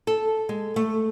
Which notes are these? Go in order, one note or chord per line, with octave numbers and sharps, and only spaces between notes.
A4
G#3
A3